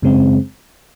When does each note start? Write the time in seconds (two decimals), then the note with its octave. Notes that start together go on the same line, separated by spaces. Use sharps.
0.02 F#2 C#3 G#3 C4